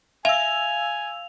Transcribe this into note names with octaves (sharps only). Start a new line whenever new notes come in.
E5 F5 G#5 E6 F7